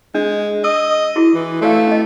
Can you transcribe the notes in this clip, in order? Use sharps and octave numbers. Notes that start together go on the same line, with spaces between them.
G#3 D4
D#5 E6
E4 F#4 G#4
E3
A3 F#4 D5 F5
C#4 D#5